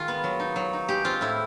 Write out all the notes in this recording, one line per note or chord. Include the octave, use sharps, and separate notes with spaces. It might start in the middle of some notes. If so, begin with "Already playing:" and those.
Already playing: D#3 G#3 F4
B3
F#3
D#4
F#3
D#4
G#3 G4
C4 F4
A2 E4